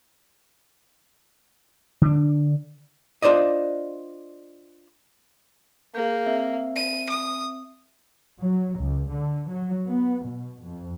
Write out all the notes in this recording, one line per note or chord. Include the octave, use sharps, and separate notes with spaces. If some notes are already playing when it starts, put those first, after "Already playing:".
D3 D4
D4 F4 C5 D5 D#5
A#3 G#4 G6
C4 E5
D#7
D#6
F#3
C#2
D3
F#3
B3
B2
F2